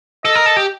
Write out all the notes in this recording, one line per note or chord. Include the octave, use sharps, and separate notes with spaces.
A4 D#5
A#4
A4
G4